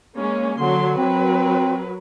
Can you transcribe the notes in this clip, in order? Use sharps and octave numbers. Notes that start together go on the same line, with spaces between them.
G#3 A#3 C#4
D3 F#3 C6
F#3 C4 A#4 B4